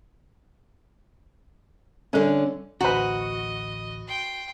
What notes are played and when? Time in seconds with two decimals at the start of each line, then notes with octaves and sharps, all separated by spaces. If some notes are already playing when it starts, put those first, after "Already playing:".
2.13 D3 G3 C#4 A4 A#4
2.81 A1 D2 F#4 B4 C5 D#5 A#5
4.08 G5 C6